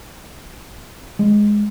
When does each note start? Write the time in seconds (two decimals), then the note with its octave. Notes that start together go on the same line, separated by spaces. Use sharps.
1.19 G#3